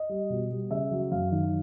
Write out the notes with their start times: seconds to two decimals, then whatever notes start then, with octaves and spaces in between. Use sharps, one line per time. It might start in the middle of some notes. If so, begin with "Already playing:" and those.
Already playing: D#5
0.09 G3
0.30 B2
0.50 G3
0.70 C#3 E5
0.91 F#3
1.11 F#2 F5
1.31 D#3